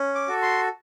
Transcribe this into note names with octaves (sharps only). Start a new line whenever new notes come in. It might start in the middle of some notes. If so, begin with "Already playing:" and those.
Already playing: C#4
D6
F#4 A4
C6